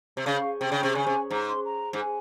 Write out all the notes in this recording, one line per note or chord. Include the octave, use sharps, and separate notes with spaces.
C3
C#3 F5
C3 G5
C#3
C3
C#3 G#5
C3
G#2 A#5
C6
A#5
G#2
G#5